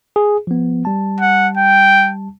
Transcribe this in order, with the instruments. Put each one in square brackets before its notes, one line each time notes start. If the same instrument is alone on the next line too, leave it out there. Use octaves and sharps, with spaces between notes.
[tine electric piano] G#4
F3 B3
G3 A5
[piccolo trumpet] F#5
G5